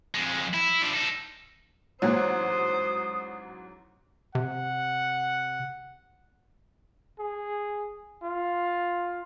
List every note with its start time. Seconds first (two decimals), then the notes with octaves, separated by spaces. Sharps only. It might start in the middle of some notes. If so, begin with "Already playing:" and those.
0.15 F2 G#3
0.54 E4
0.82 F3 D4
0.94 D#4 A4
2.02 A1 G#2 F#3 A#3 C5 C#5 D#6
4.35 C3 F#5
7.19 G#4
8.22 F4